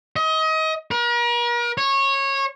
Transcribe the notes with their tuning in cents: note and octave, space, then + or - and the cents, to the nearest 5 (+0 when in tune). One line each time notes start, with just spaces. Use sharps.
D#5 +30
A#4 +40
C#5 -20